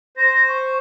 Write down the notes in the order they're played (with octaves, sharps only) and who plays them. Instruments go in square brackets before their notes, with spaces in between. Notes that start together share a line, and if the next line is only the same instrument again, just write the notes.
[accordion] C5 [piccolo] A#6
[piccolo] A#6
C#6